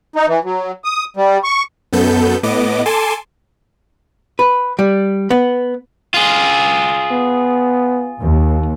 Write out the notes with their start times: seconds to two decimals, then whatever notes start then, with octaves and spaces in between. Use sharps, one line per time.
0.16 D#4
0.28 E3
0.44 F#3
0.84 D#6
1.17 G3
1.44 C#6
1.93 F#2 B3 A4 G6
2.43 A2 B3 D#5 D6
2.86 A4 G#5 A5 C6 D6
4.39 B4
4.79 G3
5.31 B3
6.14 F4 G#4
7.11 B3
8.20 D#2